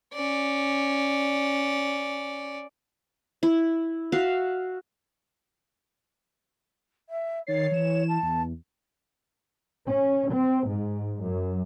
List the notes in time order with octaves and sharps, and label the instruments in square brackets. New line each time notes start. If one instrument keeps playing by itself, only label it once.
[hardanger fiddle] C#4 D5
[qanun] E4
F#4 E5 F5
[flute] E5
[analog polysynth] D#3 A6 C7 [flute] C#5
[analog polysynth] E3 E7
[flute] A5
[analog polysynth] E2
[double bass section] C#4
C4
G#2
F#2